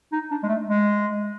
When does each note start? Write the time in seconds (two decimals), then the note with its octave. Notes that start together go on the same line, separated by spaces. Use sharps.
0.12 D#4
0.31 D4
0.43 G#3
0.48 A3
0.68 G#3